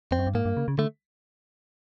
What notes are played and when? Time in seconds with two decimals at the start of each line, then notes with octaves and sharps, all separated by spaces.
0.11 F2 C4
0.19 F#2
0.27 G2
0.35 G#2 A#3
0.45 G2
0.57 C#3
0.68 C#3
0.78 D3 A3